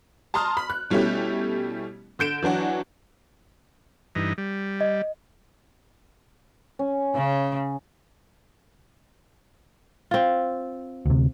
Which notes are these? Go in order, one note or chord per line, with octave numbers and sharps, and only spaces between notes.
A5 A#5 C6 D#6 F6
B5
F#6
B2 G3 A3 C#4 E4 G4
D3 G6 D7 E7
E3 F#3 D4 F#4
G2 E3 D#4
G3
D#5
C#4
C#3
C4 F4
D2 C3